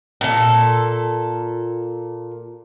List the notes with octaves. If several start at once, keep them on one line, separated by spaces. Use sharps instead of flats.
A#2 A4